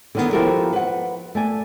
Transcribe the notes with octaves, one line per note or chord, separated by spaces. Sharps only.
D3 D#3 B3
F3 E4 F#4 G4 A4 A#4
B4 F#5
A3 D5 G#5